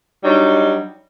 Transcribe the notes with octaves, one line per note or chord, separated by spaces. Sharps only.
F#3 G3 D4 D#4